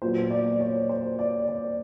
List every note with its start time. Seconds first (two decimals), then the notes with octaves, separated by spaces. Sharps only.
0.02 A#2 F#3 B3 C5
0.31 D5
0.60 C#5
0.89 C5
1.19 D5
1.48 D5